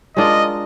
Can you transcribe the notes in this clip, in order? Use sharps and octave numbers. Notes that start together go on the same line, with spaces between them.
G#3 D4 F4 A#4 D#5